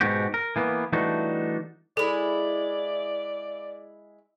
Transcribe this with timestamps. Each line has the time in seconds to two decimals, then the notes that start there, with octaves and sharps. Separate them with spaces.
0.01 G#2 B2 F#4 G4
0.34 A#4
0.56 E3 A#3 B3
0.93 E3 G3 A3 D4 D#4 F#4
1.97 G#3 E4 A4 D5